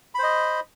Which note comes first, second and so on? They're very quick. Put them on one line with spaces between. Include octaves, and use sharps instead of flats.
B5 C5 D#5